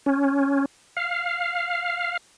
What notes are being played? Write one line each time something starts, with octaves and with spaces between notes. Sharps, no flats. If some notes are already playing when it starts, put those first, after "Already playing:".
C#4
F5